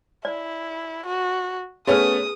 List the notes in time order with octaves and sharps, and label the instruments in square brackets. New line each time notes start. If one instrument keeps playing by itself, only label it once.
[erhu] E4 [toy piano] D5
[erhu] F#4
[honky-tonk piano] A3 B3 C#4 [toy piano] G#4 B4 [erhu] D#6